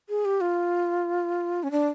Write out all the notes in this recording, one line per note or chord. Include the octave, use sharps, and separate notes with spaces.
G#4
G4
F4
C#4
D4